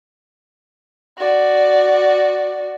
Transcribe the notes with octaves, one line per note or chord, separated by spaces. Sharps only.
F#4 D5